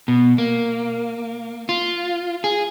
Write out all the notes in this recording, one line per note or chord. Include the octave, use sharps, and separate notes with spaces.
B2
A#3
F4
G#4